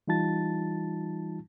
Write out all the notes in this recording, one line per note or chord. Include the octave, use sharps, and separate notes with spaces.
E3 G3 D#4 F4 A5 A6